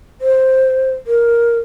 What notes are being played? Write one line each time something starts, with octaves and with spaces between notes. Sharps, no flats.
C5
A#4